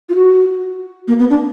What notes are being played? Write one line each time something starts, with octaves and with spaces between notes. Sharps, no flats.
F4
F#4
A#3
B3
D4